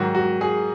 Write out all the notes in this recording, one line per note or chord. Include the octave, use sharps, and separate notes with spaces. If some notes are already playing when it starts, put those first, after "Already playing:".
Already playing: G#2 D#3 F#3 F#4
F#4
G#4